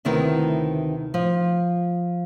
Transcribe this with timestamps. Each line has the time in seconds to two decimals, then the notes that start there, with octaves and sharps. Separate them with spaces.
0.05 D2 C3 D#3 B3 E4 F#5
1.14 F3